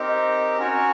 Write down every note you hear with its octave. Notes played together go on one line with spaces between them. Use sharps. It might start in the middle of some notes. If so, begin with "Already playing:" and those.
Already playing: C4 D#4 G4 A#4
C#4 F#4 A#4 C#5